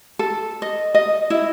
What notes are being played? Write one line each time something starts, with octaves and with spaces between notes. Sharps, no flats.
A4
D#5
D#5
E4